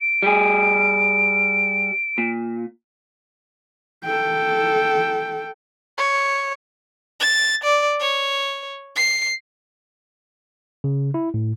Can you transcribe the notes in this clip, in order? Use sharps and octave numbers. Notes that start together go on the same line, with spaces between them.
D7
G3 G4 G#4
A#2
A4 G5
C#5
A6
D5
C#5
C7
C#3
E4
A2